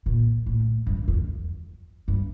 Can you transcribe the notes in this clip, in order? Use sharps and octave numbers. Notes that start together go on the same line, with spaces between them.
A#2
A2
G2
F#2
E2
G2